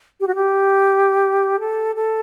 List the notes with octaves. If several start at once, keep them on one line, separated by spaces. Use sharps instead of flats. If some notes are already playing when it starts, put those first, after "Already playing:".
G4
F#4
G4
A4
A4